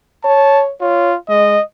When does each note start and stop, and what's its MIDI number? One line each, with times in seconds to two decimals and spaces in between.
0.24 0.71 73
0.24 0.63 81
0.81 1.16 65
0.81 1.11 73
1.29 1.56 56
1.29 1.62 75